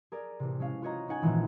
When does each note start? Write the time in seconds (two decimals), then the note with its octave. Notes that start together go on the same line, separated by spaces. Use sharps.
0.12 G#4 A#4 D5
0.40 A1 C3
0.60 G#3 C#4 F5
0.82 F4 F#4 C#5 D#5 A#5
1.08 C#4 D#4 F#5 G#5
1.22 A#1 A#2 D#3 E3 G#3